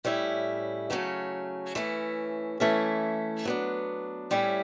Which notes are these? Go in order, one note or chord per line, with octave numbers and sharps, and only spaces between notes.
A2 G3 C#4 E4
C#3 F#3 A3 C#4
E3 A3 C#4 E4
E3 A3 C#4 E4
F#3 B3 D4
A2 G3 C#4 E4